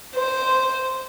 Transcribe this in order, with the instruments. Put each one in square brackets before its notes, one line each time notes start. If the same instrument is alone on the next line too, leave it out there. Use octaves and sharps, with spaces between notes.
[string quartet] C5